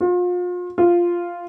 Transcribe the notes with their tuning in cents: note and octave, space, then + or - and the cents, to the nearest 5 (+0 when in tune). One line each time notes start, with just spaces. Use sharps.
F4 +35
F4 -5